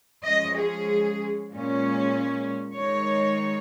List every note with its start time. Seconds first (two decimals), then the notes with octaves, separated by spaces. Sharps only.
0.23 F3 G#3 C#4 D#5
0.55 G#4
1.50 A#2 G#3 C#4
2.75 D#3 G#3 D#4 C#5